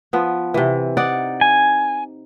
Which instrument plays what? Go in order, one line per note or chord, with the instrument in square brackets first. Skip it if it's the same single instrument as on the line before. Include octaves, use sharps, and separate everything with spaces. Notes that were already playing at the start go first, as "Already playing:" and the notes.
[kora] F3 B3
C3 E3
D#4 D5 F#5
[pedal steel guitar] G#5